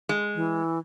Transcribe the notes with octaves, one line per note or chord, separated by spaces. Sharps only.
G#3
E3